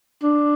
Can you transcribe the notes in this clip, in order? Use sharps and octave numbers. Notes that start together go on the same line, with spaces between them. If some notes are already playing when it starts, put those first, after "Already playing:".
D4